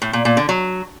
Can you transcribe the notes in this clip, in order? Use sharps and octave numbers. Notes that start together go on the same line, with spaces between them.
A2
A#2
A#2
D3
F#3